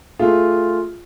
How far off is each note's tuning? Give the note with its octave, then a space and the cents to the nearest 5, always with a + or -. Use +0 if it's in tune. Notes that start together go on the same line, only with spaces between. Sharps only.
A3 +0 F4 +0 G#4 +0